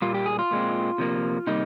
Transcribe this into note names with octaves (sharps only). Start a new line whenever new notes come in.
A#2 G3 A#3 F4
G4
G#4
F4
A#2 G#3 C4
C3 F3 A#3
C3 G3 A#3 D#4